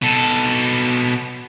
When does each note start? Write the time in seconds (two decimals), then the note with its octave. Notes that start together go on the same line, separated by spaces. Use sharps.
0.02 B2 A4